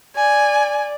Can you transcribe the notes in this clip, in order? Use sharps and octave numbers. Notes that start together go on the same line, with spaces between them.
D5 G#5